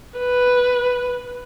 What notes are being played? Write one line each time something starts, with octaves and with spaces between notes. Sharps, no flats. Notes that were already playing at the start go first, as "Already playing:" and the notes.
B4